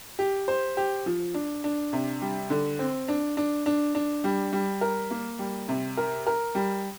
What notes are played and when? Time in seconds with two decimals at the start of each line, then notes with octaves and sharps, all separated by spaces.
0.19 G4
0.48 C5
0.77 G4
1.06 F3
1.34 D4
1.64 D4
1.93 C3
2.21 G3
2.50 D3
2.79 C4
3.08 D4
3.37 D4
3.66 D4
3.95 D4
4.24 G3
4.53 G3
4.81 A#4
5.11 A#3
5.39 G3
5.68 C3
5.97 A#4
6.27 A#4
6.55 G3